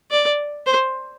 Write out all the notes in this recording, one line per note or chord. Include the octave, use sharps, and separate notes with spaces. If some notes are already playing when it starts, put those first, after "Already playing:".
D5
C5